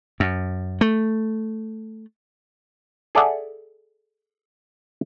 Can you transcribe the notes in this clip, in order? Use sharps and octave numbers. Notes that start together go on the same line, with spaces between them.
F#2
A3
G#4 A4 D5 E5 F#5 A5